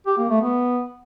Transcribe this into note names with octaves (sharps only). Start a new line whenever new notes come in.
G4
A#3
A3
B3